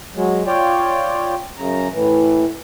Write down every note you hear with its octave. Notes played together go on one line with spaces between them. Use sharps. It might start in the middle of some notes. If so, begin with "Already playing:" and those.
F#3 G#3
F4 C#5 D5 G5
F#2 C#3 A#5
A2 E3